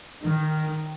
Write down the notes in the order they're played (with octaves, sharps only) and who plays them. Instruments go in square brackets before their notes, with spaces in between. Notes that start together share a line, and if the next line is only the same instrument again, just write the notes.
[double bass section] D#3